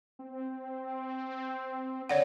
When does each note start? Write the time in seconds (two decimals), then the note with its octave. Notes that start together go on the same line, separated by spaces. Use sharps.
0.19 C4
2.09 D3 C#5 D5 F#5